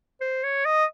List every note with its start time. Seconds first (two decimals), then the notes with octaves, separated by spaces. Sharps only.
0.21 C5
0.44 C#5
0.65 D#5